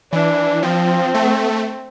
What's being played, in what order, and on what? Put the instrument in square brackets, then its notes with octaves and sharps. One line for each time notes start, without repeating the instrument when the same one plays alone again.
[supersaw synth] E3 [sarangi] D4
[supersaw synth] F3 [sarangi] C4
[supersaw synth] A3